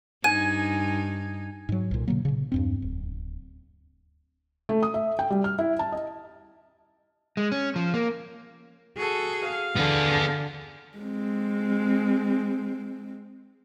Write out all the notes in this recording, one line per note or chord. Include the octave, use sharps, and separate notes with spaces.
G2 D#4 G#5 G#6 D#7
G#2 F#3
B1 A#2
B2 D3 F#3 A#3
A#2 C#3
E2 G2 C4
D1
A3
D#6
E5
G5
G3
F6
E4
A5
D#5
G#3
C#4
F3
A#3
F#4 G#4 A4
F5
D3 B3 G#4
G#3 C4